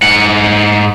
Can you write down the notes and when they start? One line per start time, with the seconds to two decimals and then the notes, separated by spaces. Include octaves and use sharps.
0.02 G#2 F#5